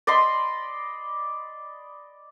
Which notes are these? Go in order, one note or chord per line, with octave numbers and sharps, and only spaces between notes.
D5 D#5 B5 C6